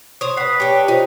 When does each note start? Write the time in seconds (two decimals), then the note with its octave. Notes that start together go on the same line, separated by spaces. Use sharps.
0.21 C5 C#5 D#6
0.37 B4 F#5 C7
0.60 D4 G4 C#5
0.88 D#4 F4 C5